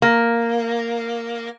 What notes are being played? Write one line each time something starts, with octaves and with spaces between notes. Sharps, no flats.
A#3